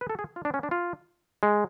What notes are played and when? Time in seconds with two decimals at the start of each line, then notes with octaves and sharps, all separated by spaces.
0.01 B4
0.10 A4
0.19 G#4
0.36 F4
0.45 D4
0.54 C#4
0.63 D4
0.71 F4
1.43 G#3